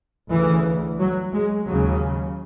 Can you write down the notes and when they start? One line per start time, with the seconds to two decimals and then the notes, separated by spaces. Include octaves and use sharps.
0.31 D2 C#3 E3
0.99 F#3
1.33 G#3
1.66 D#2 C#3 F#3